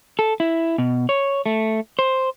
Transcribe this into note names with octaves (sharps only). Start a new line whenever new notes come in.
A4
E4
B2
C#5
A3
C5